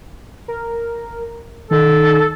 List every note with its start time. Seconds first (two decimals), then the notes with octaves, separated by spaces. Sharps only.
0.48 A#4
1.71 D#3 A4